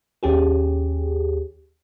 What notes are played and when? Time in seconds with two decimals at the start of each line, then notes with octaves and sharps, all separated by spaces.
0.23 D#2 C#4 G4 G#4